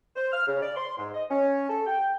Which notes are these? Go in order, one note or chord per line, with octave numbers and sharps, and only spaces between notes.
C5
F6
C#3
D5
C6
G#2
D#5
C#4
A4
G5